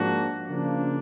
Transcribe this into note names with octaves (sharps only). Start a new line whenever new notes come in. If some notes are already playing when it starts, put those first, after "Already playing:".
Already playing: G#2 F3 A#3 D4 F#4
C#3 F3 A#3 D4